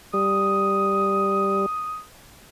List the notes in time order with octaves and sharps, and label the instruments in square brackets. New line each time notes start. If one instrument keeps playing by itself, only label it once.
[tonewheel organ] G3 [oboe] D#6